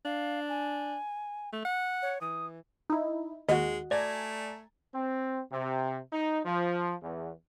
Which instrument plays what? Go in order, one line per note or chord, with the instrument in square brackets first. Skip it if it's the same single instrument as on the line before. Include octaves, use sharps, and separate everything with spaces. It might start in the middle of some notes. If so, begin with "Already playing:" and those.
[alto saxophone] D4 [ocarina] F5
[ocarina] G#5
[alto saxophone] A3
F#5
[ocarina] C#5
[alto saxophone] E3 [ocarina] D#6
[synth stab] D#4 E4
[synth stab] D#2 [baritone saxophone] G#3 [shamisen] F#4 D#5
[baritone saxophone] A3 [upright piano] D5 [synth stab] G#5 A#5 G#6
[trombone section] C4
C3
D#4
F3
E2